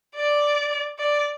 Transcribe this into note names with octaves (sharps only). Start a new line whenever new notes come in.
D5
D5